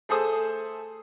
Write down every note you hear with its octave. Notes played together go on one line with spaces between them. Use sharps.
A3 G#4 A4 C5 D#6